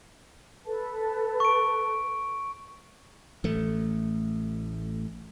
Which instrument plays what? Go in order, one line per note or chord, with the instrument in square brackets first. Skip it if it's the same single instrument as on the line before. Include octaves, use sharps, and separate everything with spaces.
[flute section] A4 B4 A5
[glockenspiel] C#6 D7
[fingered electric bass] A1 A3